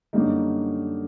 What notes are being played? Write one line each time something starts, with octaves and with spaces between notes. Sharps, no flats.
F#2 D3 G3 A#3 D#4